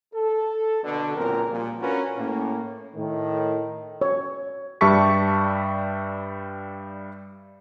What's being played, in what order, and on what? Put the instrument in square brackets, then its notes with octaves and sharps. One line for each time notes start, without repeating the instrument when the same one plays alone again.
[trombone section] A4
B2 D3
C#2 A#2 F#3 C4 A#4
A#2 F3 G3 A#3
C#4 D4 F4 F#4 A#4 B4
A2 A#3 C#4
[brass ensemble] A2 D#3
[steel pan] C#5
[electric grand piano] G2 G3 E5 A5 C#6 B6